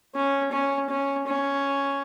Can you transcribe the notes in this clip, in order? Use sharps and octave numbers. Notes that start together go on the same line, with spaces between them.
C#4
C#4
C#4
C#4